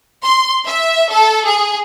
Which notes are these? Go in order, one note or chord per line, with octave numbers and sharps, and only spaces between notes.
C6
E5
A4
G#4